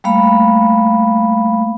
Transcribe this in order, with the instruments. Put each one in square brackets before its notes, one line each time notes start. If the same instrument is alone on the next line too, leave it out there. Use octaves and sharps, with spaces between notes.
[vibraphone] G3 A3 A#3 F5 B5